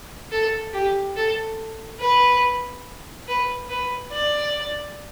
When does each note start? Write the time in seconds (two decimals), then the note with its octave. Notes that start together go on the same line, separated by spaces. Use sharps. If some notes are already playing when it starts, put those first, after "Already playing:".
0.31 A4
0.74 G4
1.16 A4
2.00 B4
3.28 B4
3.69 B4
4.12 D5